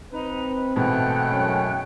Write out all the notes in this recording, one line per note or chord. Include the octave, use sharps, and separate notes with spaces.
C4 D#4 B4 A#5
G#2 B2 E3 G#3 A3 F#5 G5 F#6
F#2 C#4